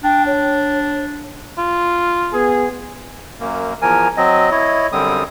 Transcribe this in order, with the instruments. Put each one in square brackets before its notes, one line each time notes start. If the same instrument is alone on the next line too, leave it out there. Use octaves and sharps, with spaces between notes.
[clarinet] D4 [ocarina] G5
[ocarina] C#5
[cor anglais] F4
[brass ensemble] B3 G#4
[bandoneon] F#2 A#3
E2 F3 A#4 G#5
F#3 C4 D#5
E4 C#5 D#5
F#2 D3 G3 C4 D#6